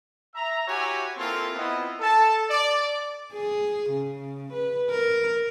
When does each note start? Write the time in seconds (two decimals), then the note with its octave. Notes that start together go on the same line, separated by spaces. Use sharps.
0.35 E5 A#5
0.67 E4 F#4 G4 C#5 G#5
1.17 A#3 C4 E4 F4 A4
1.54 B3 C4 E4 F4 D#5
2.00 A4 A5
2.50 D5
3.33 G#4
3.90 C#3
4.53 B4
4.90 A#4